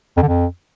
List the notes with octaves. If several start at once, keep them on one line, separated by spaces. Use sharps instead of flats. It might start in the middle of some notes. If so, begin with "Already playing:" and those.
F2
D3
F2